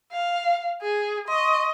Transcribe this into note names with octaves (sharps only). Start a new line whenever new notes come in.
F5
G#4
D#5 C6 C#6